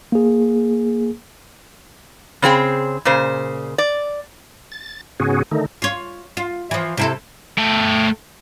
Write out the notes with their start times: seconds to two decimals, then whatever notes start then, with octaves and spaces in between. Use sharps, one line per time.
0.12 A#3 G#4
2.42 C#3 C4 G#4 G5
3.05 A#2 C#3 C5
3.78 D5
4.72 A6
5.20 G#2 C#3 B3 C#4 F#4 G#4
5.51 D3 D#3 A3 D#4
5.82 F4 C#5
6.37 F4
6.71 E3 F3
6.97 C3 E4 A4
7.58 A3 G5